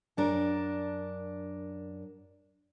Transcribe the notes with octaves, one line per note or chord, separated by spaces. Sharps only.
F#2 D4 A#4